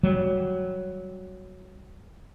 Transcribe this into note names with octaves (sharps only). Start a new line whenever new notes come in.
F#3 G3